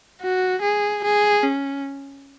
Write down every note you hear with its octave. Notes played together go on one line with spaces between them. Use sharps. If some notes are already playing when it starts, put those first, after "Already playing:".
F#4
G#4
G#4
C#4